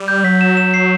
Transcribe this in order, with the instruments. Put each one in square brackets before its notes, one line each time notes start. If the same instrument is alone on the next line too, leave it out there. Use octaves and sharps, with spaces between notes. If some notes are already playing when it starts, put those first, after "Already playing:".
Already playing: [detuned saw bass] G3
[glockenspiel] G6
[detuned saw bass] F#3 [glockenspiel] B6
[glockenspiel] E7
E7
C7